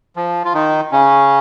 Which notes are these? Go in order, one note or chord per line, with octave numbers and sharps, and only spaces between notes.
F3
F4
D#3 D#4
C#3 C#4